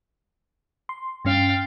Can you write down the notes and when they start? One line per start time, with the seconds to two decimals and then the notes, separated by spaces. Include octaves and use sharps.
0.89 C6
1.25 G2 C#4 F5 G5 A6